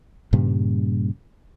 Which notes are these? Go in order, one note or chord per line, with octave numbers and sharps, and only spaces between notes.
G2 A#2 C#3 G3